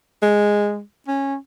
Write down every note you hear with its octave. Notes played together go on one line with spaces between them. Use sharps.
G#3
C#4